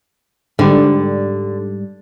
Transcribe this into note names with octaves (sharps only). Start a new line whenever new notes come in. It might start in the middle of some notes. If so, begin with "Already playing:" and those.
G#2 D3 G3